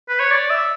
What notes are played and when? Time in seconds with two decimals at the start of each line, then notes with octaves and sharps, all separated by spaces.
0.09 B4
0.20 C#5
0.31 D5
0.50 E5